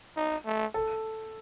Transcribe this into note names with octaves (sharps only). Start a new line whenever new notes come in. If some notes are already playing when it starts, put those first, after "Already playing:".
D#4
A3
A4